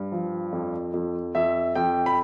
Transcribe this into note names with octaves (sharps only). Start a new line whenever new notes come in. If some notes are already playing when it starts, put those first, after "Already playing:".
Already playing: G2
F3
F2
F2
F2 E5
F2 G5
B5